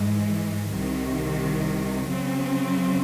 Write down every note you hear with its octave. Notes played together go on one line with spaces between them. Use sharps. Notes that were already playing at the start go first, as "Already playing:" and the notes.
Already playing: G#2 E3 G#3
C2 C3 D#3
C#3 F#3 C4